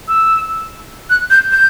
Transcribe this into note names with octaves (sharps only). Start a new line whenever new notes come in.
E6
F#6
G6
G6